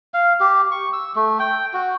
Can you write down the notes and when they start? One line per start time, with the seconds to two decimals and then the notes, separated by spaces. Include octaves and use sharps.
0.14 F5
0.40 G4
0.71 C#6
0.93 E6
1.15 A3
1.39 G5
1.73 F#4